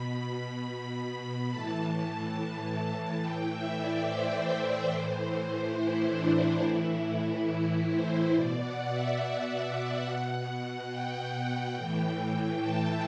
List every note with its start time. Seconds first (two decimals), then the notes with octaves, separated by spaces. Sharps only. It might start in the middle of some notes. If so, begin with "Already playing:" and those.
Already playing: B2 B5
1.50 A2 E3 A5
1.79 A5
2.08 A5
2.36 A5
3.21 A2 E3 G5
3.49 E5
3.78 D5
4.07 C5
4.91 A2 E3
5.76 E4
6.05 D4
6.34 D4
6.62 A2 E3 E4
7.48 E4
7.90 C5
8.33 B2 D5
8.61 F#5
8.90 E5
9.18 E5
10.03 B2 F#5
10.89 G5
11.74 A2 E3 G5
12.60 A5